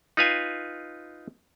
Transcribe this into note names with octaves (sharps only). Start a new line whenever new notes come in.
D#4 F4 B4 F5 G#5